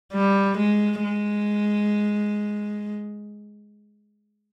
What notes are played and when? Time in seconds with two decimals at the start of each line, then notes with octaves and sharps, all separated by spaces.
0.13 G3
0.58 G#3
1.03 G#3